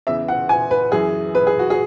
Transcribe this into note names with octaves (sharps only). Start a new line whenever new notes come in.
E2 C#3 E3 E5
F#5
G#5
B4
F#2 E3 G#4
B4
G#4
F#4
G#4